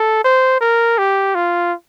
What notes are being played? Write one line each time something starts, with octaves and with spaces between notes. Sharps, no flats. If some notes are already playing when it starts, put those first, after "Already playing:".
Already playing: A4
C5
A#4
G4
F4